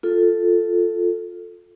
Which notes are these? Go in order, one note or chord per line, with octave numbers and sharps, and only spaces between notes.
F4 A4